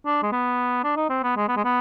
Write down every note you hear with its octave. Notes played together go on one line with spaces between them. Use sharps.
D4
G#3
B3
D4
D#4
C4
B3
G#3
B3
G#3
B3